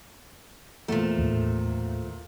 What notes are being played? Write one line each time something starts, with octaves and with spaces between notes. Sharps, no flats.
E2 A#2 F3 A3
D#2 A2